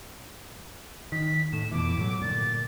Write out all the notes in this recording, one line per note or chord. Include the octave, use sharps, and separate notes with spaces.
D#3 B6
A2 E7
F2 B2 E3 D6
A2 F3 F#3
G2 A#2 D3 A6